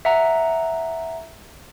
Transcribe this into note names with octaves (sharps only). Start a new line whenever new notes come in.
E5 F#5 A#5